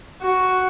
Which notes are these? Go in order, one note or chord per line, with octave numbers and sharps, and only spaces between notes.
F#4